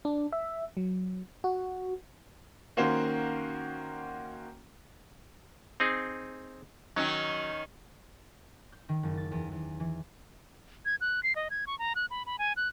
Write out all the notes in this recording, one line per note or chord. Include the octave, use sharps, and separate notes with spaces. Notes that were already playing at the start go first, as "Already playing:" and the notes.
D4
E5
F#3
F#4
D#3 A#3 C#4 F#4 C5
C4 D#4 G#4
D#3 F#3 C#4 D#4
G6
D#3
F#1
A6
E2
E2
E3
G#6
F#6
C7
D#5
G#6
C#6
A#5
F#6
B5
B5
G#5
F#6